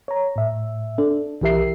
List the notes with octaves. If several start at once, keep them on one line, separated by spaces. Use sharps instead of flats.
C#5 A#5
A2 E5
D4 A4
B1 E3 G4 A#4 E5 C7